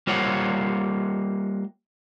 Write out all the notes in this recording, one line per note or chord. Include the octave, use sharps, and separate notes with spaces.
G3 A#3 F4 C5 C#5 F#5